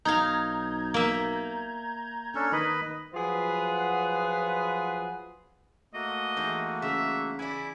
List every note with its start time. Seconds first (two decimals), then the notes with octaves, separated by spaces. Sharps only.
0.05 B1 D#4 F5 A#5 G6 G#6
0.94 A#3 E5
2.35 C#4 D4 A4
2.52 D#3 B4 D#5 B5
3.13 F3 F#3 F4 G#4 B4 F#5
5.94 A3 A#3 F#4 D#5
6.36 E2 D#4 C5
6.82 C#3 E5
7.39 E4 D5 G#5 B5